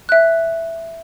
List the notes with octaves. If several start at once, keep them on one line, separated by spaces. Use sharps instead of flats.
E5 F#6